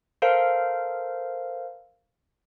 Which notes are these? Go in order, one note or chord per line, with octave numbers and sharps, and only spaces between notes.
A4 A#4 C5 F5